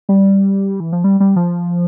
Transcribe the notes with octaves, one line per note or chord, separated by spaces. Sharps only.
G3
E3
F3
G3
G3
F3